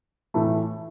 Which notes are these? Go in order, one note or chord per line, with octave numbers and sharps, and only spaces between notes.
A2 E3 A3